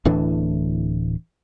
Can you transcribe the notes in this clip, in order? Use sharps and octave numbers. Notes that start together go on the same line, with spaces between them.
D1 A2 E3 D4